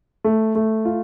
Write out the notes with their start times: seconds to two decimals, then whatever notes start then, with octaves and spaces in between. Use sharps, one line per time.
0.24 A3
0.55 A3
0.85 F4